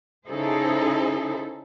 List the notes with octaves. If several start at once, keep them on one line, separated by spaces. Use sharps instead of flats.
C#3 D#4 E4 G#4 A4 C5